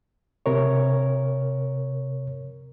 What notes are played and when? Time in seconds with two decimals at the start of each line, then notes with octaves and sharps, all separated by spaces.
0.46 C3 A#4 C#5